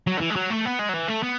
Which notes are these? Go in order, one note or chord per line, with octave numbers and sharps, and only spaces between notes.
F#3
D3
E3
G#3
F#3
A3
B3
G#3
F#3
E3
A3
B3